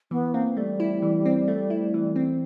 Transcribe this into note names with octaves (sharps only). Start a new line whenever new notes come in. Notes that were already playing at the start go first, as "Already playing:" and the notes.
E3 B3
A#3 C4
G3 A3
E4
E3
C4
A3
E4
E3
C4